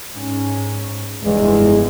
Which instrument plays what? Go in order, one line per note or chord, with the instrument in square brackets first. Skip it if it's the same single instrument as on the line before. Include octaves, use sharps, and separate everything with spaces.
[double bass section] G#2 C#4
[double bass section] F1 G2 [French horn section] E2 G#3